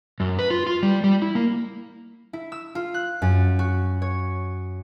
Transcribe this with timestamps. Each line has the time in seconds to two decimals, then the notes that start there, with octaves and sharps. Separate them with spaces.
0.20 F#2
0.39 B4
0.51 F4
0.67 F4
0.83 G3
1.04 G3
1.22 E4
1.35 A#3
2.33 E4
2.52 E6
2.75 F4
2.94 F#6
3.22 F#2
3.59 F#4
4.02 C#5